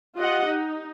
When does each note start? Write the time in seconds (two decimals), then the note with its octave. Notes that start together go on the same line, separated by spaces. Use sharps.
0.17 F4 G4 D#5 F#5
0.48 D#4